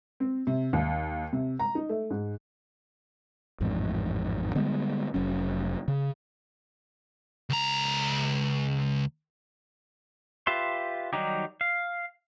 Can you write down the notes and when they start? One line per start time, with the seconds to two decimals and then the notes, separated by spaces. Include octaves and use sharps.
0.20 C4
0.47 C3
0.73 D#2
1.33 C3
1.59 A#5
1.75 D#4
1.89 A3
2.10 G#2
3.60 A1 F2 G#2
4.55 D3 G3 G#3 B3
5.14 F1 F#3 C#4
5.88 C#3
7.50 C#2 A#5
10.47 F4 G4 B4 E5 C6
11.13 D#3 F#3 G3 D#4 G4
11.61 F5